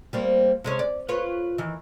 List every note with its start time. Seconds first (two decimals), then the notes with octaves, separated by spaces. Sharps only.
0.13 G3 A#3 C4
0.64 C3 G#3 C#4
0.79 D5
1.09 F4 B4 C#5
1.58 D#3 E3